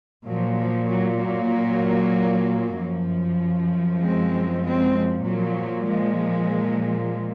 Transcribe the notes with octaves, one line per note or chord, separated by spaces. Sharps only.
A#2 F3 F#3
F3
F#3
F#3 A#3
F#2 F3
G#3 C4
G#3 C4
F3
A#2 F3 F#3
F3 G#3